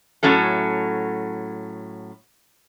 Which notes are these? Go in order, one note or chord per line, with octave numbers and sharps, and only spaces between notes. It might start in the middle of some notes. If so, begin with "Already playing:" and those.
A2 F#3 C#4 A4